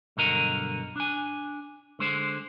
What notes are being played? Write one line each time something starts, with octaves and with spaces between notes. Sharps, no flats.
B1 G2 D3 F#4 A#4 D#5
D4 G#5
D3 G#3 C5